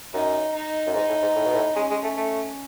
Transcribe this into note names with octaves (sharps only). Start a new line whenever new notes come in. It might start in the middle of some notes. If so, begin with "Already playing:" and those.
F#2 D#4
D#4
F#2
G#2 D#4
A2
G#2
A2
B2
A2
G#3 C#4
G#3
A3
A3